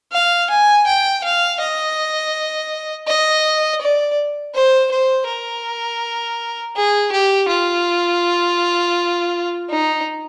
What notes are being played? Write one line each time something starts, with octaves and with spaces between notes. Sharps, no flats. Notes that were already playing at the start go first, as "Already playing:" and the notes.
F5
G#5
G5
F5
D#5
D#5
D5
C5
C5
A#4
G#4
G4
F4
D#4